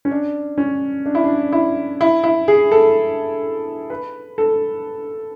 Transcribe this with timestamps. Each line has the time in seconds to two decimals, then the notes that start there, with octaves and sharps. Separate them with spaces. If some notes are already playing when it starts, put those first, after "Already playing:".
0.05 C#4
0.11 D4
0.58 C#4
1.06 D4
1.15 E4
1.24 D4
1.52 E4
2.01 E4
2.24 E4
2.48 G#4
2.71 A4
3.90 B4
4.38 A4